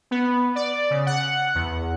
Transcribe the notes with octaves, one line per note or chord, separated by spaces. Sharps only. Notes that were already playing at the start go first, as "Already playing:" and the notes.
B3
D5
C#3
F#5
E2